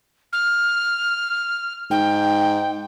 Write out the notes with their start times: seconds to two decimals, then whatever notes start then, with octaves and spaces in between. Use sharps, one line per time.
0.32 F6
1.90 G#2 G5